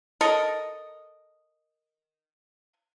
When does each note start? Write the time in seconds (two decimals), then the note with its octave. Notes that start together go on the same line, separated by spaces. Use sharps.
0.21 A4 A#4 D#5